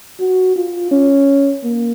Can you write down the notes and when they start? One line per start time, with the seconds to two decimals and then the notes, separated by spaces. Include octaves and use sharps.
0.20 F#4
0.56 F4
0.91 C#4
1.64 A#3